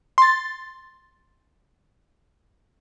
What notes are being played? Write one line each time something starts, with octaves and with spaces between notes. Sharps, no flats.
C6 A6